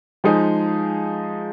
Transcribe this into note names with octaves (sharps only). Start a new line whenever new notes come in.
F3 G#3 D#4 G#4